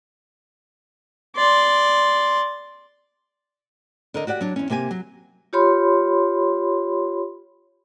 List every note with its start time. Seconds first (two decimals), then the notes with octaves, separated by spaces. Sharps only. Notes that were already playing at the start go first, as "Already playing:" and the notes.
1.36 D5 C6
4.14 D3 A#4 D#5
4.27 F#4 G4 D5 F#5
4.41 F#3 D4
4.56 E2 C#4
4.70 C3 A#3 G4 G#5
4.91 F#3
5.53 F4 G4 C#5 B5 C6